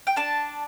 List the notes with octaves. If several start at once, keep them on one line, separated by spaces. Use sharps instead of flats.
G5
D4 A5